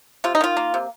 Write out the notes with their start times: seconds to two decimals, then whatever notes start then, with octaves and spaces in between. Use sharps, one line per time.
0.24 C3 F4
0.35 D#4
0.41 D#3 F4
0.57 A#3
0.74 C3